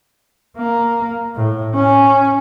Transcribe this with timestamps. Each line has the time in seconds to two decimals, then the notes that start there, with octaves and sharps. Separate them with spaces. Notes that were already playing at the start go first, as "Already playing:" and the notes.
0.57 A#3
1.36 A2
1.75 C#4